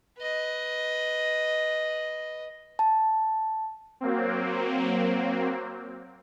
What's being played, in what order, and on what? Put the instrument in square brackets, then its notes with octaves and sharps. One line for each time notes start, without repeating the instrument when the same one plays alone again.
[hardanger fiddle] B4 D#5
[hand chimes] A5
[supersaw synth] F#3 A#3 C4